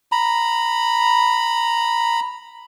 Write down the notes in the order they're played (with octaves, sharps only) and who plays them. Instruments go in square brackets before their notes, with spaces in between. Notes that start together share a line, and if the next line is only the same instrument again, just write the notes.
[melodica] A#5 B5